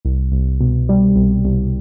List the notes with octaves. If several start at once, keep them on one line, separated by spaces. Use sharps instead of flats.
C2
C2
B2
G3
C2
C2